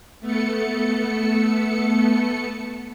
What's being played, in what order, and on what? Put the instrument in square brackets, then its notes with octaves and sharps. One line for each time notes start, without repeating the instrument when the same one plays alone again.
[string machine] A3 B3 A4 C#7